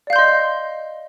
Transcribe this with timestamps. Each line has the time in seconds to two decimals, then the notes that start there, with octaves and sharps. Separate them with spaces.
0.07 D5
0.10 F5
0.13 G6
0.16 C6
0.19 D#5